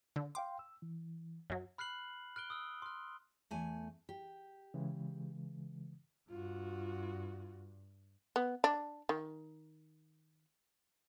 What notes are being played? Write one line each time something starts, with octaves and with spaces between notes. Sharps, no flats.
D3
F5 G5 C6 D6
E6
E3
F#2 F#3
B5 F6 F#6 C7 F#7
F6 F#6 D7 G7
D#6 E6
C6 F6
E2 A3 G#5
G4
C#3 E3 G#3
G2 F4 F#4
B3
D4
D#3